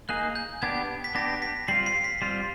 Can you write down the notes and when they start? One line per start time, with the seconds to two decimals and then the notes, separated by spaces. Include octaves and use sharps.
0.09 A#3 D#4 G#4 F#6
0.35 G6
0.62 B3 D4 G4 G#6
1.04 B6
1.15 B3 D4 G4 A#6
1.42 B6
1.68 G3 C4 F4 C7
1.86 C7
2.04 B6
2.22 G3 C4 F4